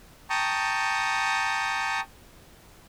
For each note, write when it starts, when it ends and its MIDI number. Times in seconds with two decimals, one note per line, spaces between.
0.30 2.00 79
0.30 2.00 81
0.30 2.00 82
0.30 2.00 85
0.30 2.00 87